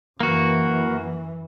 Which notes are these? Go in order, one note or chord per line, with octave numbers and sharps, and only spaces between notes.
F#2 E3 A#3 F#4